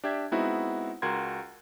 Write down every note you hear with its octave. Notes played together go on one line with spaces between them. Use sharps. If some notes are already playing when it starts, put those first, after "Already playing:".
D4 G4 E5 G#6
G#3 B3 C4 D#4 E4 F#4
C#2 F#4 A#4 C6 F#6 G#6